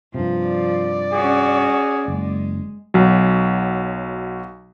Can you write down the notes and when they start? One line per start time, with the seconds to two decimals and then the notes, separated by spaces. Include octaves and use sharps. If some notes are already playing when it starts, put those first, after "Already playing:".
0.14 G2 C3 F3
0.48 D5
1.13 C#4 F#4 G#4
2.08 F#1 G#3
2.94 B1 F#3